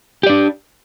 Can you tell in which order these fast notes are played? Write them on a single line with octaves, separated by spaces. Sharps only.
G4 D5 D4